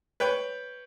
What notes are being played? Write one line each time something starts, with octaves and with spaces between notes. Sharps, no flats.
B4 C#5 G5